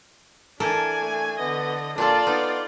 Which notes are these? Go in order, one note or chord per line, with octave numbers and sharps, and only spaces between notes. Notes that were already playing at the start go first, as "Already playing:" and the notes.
E3 D4 A4 A#4 G#5
A3
D3 B3 D#5
A#2 D4 F4 A4 D5
B3 D#4